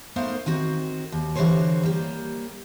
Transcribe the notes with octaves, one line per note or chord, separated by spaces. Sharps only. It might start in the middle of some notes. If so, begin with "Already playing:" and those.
A3 B3 D#4 A#4 C5 F5
D#3 C4 F#4
D#2
D3 E3 F#4 G4 C5 C#5
G3 A#3 G4